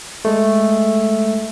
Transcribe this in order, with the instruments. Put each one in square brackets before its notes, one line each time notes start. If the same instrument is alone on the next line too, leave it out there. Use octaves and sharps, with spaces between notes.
[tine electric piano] G#3 A3